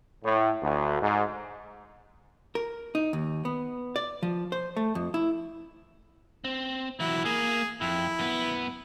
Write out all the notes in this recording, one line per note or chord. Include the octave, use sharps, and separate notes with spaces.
A2
D2
G#2
A#4
D#4
D#2
B3
D5
F3
C5
A3
F2
E4
C4
E3 F#3 E4
A#3 G#4
F2 E4
F#2 B3